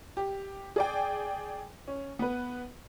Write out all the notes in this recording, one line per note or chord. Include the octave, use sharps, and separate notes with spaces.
G4
G#4 D5 G5
C#4
B3 B4